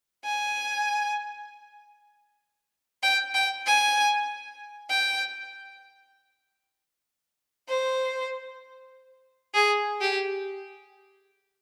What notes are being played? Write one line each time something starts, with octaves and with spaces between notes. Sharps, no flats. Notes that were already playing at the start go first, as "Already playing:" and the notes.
G#5
G5
G5
G#5
G5
C5
G#4
G4